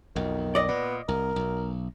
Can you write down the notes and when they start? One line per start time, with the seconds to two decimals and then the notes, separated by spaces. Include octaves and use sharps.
0.16 B1 F2 D#3
0.55 D5 D#5
0.68 A#2 B3
1.08 C2 A#4
1.36 B1